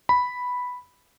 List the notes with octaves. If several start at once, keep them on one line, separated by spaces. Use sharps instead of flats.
B5